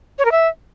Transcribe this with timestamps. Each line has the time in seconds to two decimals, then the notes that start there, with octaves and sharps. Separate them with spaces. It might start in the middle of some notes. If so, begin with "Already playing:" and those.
0.19 C#5
0.25 A#4
0.32 E5